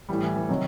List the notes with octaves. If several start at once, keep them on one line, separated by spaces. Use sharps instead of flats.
A2 E3 G3
E3
E3
C3 D#3 F#3